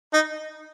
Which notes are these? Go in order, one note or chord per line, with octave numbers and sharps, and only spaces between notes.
D#4